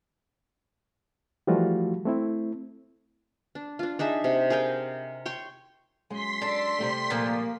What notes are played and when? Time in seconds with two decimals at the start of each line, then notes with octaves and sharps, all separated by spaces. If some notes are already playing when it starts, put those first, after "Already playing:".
1.47 E3 F3 G3 A3 F4 F#4
2.05 A3 C4 E4
3.55 D4
3.79 D4 F4
3.99 D4 D#4 G#4 E5
4.24 C3
4.50 G#4 A#4 F5 G5
5.26 C#5 G5 C6
6.10 F#2 G#3 C6 B6
6.42 D4 A4
6.79 C3 G3 A3
7.10 A#2 F3 A#3